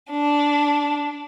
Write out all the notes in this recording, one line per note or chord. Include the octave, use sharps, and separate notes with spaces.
D4